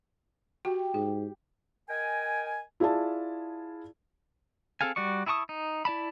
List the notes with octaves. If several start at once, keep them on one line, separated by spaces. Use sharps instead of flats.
F#4 G4
G#2 G#4
A#4 D#5 G5 G#5
E4 F4 G#4 D5 A5
C4 G#4 A4 F5 G#5
G3 F#4 D5 C#6
E4 G#4 A5 C#6 D#6
D#4
E4 D5 A5 B5